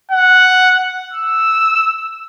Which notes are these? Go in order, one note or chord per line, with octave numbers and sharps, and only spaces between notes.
F#5
E6